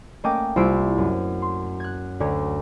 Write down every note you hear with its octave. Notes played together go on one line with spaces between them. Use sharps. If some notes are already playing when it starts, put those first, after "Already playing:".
A3 A#3 C#4 D#5 G5 D6
C2 E4 F4 E6 C7 D7
F#2
C6
F#6 G#6
D2 D3 C#5